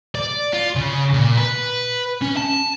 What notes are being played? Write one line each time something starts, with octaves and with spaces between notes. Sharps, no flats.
D5
F4
C#3
A#2
B4
C#4
A5